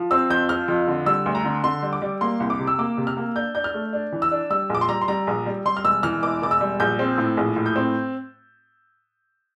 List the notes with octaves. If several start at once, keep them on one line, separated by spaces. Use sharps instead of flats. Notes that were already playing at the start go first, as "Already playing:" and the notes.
Already playing: F3
C4 E6
F2 G6
F3 F6
F2
D3
G3 E6
D2
A#5
D3
D3 C6
G3
D6
G3
A#3 C6
C2
D6
C3
E6
A#3 D6
C3
F6
A#3
D4 G6
D4 G6
F6
A3
D4
E3
E6
D4
G3 E6
A#1 D6
C6
G3 A#5
C6
G3 A#5
A#1
G3
G3 C6
F6
E1 E6
E3 F6
E1 D6
E1 D6
E6
G3
A#1 G6
C4
A2
A#1
A2
G6
C4